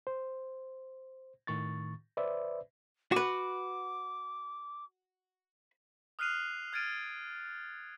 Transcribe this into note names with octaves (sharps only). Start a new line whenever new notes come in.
C5
A2 D#3 C#6 A6
B4 C5 D5 E5
F#4 B4 D6
D#6 F6 F#6 C7 D#7 F7
F6 G#6 A6 D7 D#7